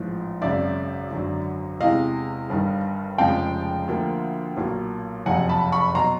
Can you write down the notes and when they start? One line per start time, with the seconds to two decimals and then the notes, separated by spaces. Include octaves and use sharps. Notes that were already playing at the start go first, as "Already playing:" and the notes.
Already playing: A1 G#2 F3
0.41 G#1 F#2 C#3 D5 E5
1.11 G#1 F#2 D3 F#3
1.80 E2 C3 E3 G#3 D#5 F5
2.49 G1 G2 D#3
3.18 F1 F2 C#3 F3 G#3 F5 G5
3.88 D2 D3 F3 A#3
4.57 B1 A#2 F#3 A#3
5.26 F#1 F2 C3 F#5 G#5
5.49 A5 B5
5.72 B5 C#6
5.95 B2 F#3 A#5 C6